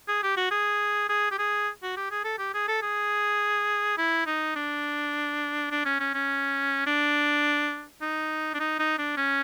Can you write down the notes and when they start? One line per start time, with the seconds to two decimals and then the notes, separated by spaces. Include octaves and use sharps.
0.08 G#4
0.23 G4
0.37 F#4
0.51 G#4
1.09 G#4
1.31 G4
1.39 G#4
1.83 F#4
1.97 G4
2.11 G#4
2.25 A4
2.39 G4
2.54 G#4
2.68 A4
2.82 G#4
3.98 E4
4.27 D#4
4.56 D4
5.71 D4
5.85 C#4
6.00 C#4
6.14 C#4
6.87 D4
8.02 D#4
8.54 D4
8.60 D#4
8.79 D#4
8.99 D4
9.17 C#4